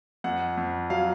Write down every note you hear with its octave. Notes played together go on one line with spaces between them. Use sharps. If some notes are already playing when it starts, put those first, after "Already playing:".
F2 F#5
F2
F#3 F5